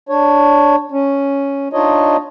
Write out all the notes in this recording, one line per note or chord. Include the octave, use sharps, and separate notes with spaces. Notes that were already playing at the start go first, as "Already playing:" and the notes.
D4 C#5
C#4
D4 D#4 F4 C#5 D#5